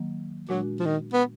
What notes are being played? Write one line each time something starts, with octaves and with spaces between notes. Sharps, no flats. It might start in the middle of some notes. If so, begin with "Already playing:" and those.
Already playing: D#3 F#3 A#3
A#2 F#3 G#3 D4 F#4
F3
D#3
B3